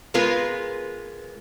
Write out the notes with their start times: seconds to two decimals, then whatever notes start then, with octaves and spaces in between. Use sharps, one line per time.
0.14 G#3 B3 F4 A#4 B4